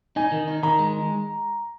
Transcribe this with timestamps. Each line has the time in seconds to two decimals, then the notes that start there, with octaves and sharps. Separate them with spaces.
0.16 D#4 G#5
0.32 D#3
0.48 D#4
0.63 D#3 A#5
0.79 G#3